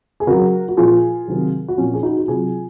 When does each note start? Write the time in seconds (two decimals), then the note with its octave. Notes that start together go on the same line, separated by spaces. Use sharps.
0.20 G#4
0.27 C#3 F#3 F#4 A#4
0.69 F#4
0.77 A#2 F3 F4 G#4
1.28 C3 D#3 F#3
1.68 F#4
1.78 A#2 F3 C#4 F4
1.94 G#4
2.03 D#4 F#4
2.17 F#4
2.28 C3 F#3 F4 G#4